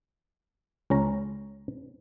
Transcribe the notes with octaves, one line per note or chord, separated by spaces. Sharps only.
C#2 C#4 A#5